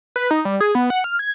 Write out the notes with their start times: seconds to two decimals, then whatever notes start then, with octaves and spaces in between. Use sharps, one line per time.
0.16 B4
0.31 D#4
0.45 G3
0.61 G#4
0.75 B3
0.90 F#5
1.04 F6
1.19 G#6